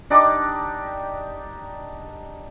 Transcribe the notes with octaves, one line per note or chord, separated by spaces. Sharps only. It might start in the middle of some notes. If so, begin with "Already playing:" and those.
D4 D#4 G4 D5